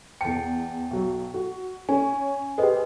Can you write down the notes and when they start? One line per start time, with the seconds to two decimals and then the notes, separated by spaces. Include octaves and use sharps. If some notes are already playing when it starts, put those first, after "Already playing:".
0.21 E2 G5 A5 C#7
0.91 B1 F#3
1.34 F#4
1.89 C#4 G#5
2.58 G4 G#4 B4 C5 D#5